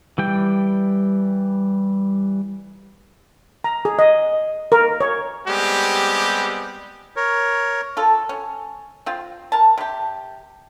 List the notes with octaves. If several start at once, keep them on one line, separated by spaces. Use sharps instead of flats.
E3 G3 G5
A#5
G#4
D#5
A#4
C#5
G3 G#3 B3 C4 G4
A#4 C#5
F4 A4
C#4
C4 F4
A#4 A5
C3 G4